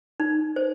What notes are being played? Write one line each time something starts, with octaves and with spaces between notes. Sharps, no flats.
D#4
C5